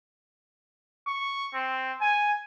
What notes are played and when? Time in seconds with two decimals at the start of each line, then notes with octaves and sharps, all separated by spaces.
1.07 C#6
1.54 C4
2.01 G#5